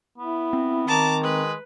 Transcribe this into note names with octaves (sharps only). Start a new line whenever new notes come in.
B3 E4
C4
D#3 A5 A#5 D6
G#3 B4